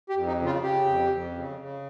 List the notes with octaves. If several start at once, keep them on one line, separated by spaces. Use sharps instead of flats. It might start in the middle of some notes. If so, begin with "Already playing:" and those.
G4
F2
D#4
C#3
F4
C#3 G4
F2
F2
C#3
C#3